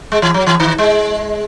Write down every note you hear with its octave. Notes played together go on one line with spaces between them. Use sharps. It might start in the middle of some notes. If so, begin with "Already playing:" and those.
G#3
E3
F#3
E3
D#3
G#3